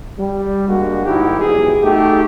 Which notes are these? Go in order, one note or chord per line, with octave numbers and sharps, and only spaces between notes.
G3
G#3 A#3 D4 F#4
G#2 D#3 D#4 E4 G4
B1 E2 G#4
A3 D#4 F#4 G4